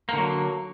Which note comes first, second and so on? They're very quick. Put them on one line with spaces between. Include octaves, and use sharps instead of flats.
A#3 D3 F#3